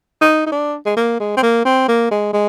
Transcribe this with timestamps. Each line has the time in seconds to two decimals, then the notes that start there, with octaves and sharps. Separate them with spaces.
0.21 D#4
0.47 D#4
0.52 D4
0.86 G#3
0.97 A#3
1.20 G#3
1.37 C4
1.43 A#3
1.65 C4
1.88 A#3
2.11 G#3
2.33 G#3